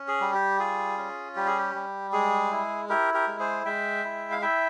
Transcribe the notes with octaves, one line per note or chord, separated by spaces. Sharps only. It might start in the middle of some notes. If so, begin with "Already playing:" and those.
Already playing: C#4
G#4
G3
G4
F4 G#4
C#4
G3 G4
G#4
G4
G3
G#3 G#4
E4
E4 G4 A#4
G4 A#4
G#3
G#4 C5
G#3 E5 G5
E4
F5
E4 E5 G5